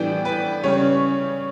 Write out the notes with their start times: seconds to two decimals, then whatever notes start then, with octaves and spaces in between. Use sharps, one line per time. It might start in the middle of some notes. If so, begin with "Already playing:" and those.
Already playing: A2 E3 G3 B3 D4 G5
0.25 B4
0.64 C#3 G3 C#4 C#5